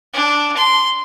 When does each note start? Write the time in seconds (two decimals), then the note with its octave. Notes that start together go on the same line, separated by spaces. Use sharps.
0.13 D4
0.57 C6